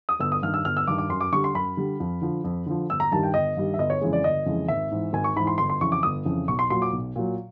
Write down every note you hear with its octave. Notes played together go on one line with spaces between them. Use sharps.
D#6
G1 E6
D#6
G2 D#3 F6
E6
G1 F6
E6
G2 D#3 D6
D6
F#2 C6
D6
D3 G3 C#6
C6
F#2 B5
D3 G3
F2
D3 F3
F2
D3 F3
G1 E6
A#5
G2 D#3 G3 A5
G5
G1 D#5
G2 D#3 G3
E5
G1 D#5
C#5
F2 C#3 E3 G#3
D5
G1 D#5
F2 C#3 E3 G#3
G#1 E5
G#2 E3
G#1 G#5
C#6
G#2 E3 B5
C6
G1 C6
C6
F2 C#3 E3 C#6
D6
G1 D#6
F2 C#3 E3
B1 C#6
C6
A#2 F#3 C6
D6
B1
A#2 F#3